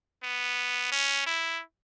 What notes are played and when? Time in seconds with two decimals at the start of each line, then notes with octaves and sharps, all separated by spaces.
0.23 B3
0.92 C#4
1.26 E4